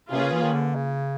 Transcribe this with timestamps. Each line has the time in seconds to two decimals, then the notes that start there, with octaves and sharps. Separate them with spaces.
0.11 C3 A#3 C#4 F4 G#4 B4
0.22 C#3
0.32 E3
0.43 D#3
0.53 D3
0.75 C#3